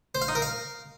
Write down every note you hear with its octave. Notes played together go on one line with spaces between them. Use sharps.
C5
F5
D#4
A#4
F5